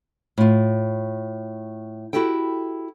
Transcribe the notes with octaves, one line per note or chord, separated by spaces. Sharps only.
A2 F4
E4 F#4 G4 A4 G5